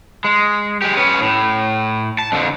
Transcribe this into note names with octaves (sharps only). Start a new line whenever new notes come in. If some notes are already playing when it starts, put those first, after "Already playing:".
G#3
G#3 G4
C#4 B4
A2
A5
F2 D3